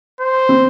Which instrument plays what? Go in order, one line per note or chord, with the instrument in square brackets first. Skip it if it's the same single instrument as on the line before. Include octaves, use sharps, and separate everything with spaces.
[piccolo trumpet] C5
[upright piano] C4